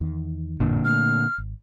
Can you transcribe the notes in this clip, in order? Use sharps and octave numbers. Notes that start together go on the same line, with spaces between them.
E2 D#3
A1 F#2 A#2 D3
A3 F6
G#1